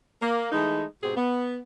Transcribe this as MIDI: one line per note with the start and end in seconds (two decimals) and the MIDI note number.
0.22 0.48 58
0.52 0.83 52
0.52 0.83 56
0.52 0.83 57
0.52 0.83 63
1.02 1.12 44
1.02 1.12 47
1.02 1.12 60
1.02 1.12 67
1.02 1.12 68
1.16 1.56 59